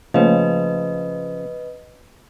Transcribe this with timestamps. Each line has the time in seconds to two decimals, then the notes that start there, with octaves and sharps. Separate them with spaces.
0.14 C#3 F3 A3 A#3 B4 C#5 D#5